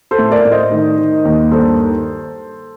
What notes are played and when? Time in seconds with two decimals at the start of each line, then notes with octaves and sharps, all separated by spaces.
0.11 A4 C5
0.19 A2
0.31 A#4 D5
0.45 A2
0.51 C5 D#5
0.71 D#3
0.98 D#3
1.25 D#2
1.51 G2 A4 C5